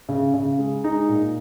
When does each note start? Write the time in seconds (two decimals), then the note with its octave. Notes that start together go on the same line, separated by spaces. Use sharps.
0.09 C#3
0.34 C#3
0.59 G#3
0.84 G#3 D#4
1.09 A#2